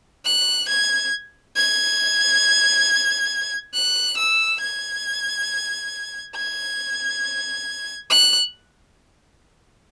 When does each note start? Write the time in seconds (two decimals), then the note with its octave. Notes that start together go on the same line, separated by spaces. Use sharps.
0.25 F#6
0.68 G#6
1.56 G#6
3.73 F#6
4.17 E6
4.61 G#6
6.35 G#6
8.10 F#6